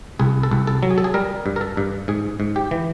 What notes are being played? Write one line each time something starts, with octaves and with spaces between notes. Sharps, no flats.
C2 G#4
A4
C2
A4
F#3
G#4
A4
G#4
G3 A#4
G2
A#4
A4
G2
G#2 G#4
G#2
G4
E3